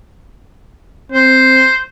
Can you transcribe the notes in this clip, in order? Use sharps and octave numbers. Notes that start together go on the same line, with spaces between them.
C4 C5